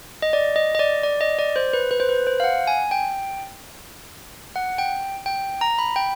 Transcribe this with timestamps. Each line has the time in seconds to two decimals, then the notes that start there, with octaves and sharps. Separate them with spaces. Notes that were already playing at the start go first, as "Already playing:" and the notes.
0.22 D#5
0.33 D5
0.56 D#5
0.75 D#5
0.79 D5
1.03 D5
1.21 D#5
1.39 D5
1.56 C5
1.73 B4
1.91 B4
2.00 C5
2.09 B4
2.27 C5
2.40 F5
2.44 F#5
2.67 G#5
2.91 G5
4.56 F#5
4.78 G5
5.26 G5
5.61 A#5
5.79 B5
5.96 G5